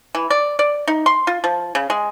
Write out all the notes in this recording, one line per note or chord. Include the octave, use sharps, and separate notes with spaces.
E3
D5
D5
D#4
C6
F4
F3
C#3
G#3